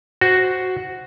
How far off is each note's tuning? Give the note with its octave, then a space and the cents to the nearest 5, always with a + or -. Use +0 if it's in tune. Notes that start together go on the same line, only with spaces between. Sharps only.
F#4 +0 C5 +0